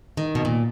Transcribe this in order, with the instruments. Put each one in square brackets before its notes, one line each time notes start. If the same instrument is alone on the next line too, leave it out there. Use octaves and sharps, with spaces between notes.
[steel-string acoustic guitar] D#3
B2
A#2